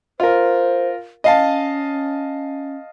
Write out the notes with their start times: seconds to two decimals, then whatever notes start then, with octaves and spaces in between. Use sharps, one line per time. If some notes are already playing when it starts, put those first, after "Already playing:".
0.20 F4 A#4 C5
1.24 C#4 D#5 F5 A5